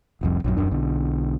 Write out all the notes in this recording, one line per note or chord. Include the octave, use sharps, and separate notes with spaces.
F1 C2 F2
A#1 F#2
D#1 F#2 D4
B1 B2 D3